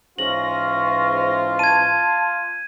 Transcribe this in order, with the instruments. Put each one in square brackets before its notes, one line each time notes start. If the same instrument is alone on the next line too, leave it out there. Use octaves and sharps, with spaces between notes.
[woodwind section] G#2 E3 C#4 [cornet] F4 [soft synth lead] A#6 [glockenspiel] F#7
[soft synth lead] A5 [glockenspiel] G#6 D#7